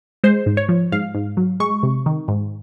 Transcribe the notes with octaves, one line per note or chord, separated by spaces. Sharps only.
G#3 C5
G#2
C#5
F3
G#2 F5
G#2
F#3
G#3 C#6
C3
D#3
G#2